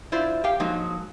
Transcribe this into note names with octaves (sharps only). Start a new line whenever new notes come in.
E4 F4 C5 D5 E5
G4 F5 G5
F3 F#3 G#3 A#3 D#4